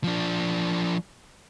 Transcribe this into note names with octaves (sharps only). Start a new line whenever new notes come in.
F3 D4